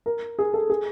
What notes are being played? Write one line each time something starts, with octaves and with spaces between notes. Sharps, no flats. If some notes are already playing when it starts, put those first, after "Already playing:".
A#4
G#4
A4
G#4